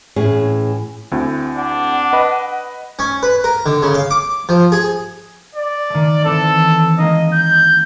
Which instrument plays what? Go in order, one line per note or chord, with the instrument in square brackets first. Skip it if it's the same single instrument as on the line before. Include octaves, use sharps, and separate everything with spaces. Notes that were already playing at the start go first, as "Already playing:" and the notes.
[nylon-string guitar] A2 E3 C#4 G#4
[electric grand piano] D2 C4 E4
[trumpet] D4 [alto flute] F#5
[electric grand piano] B4 D#5 B5
[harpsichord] C#4
B4
A#4
D3
C#3
F5
D6
F3
G#4
[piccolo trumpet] D5
[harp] D#3 A3
[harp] E3 C4 [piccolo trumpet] A4
[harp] G#3 A#3 D#4 [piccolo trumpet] D#5
[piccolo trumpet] G6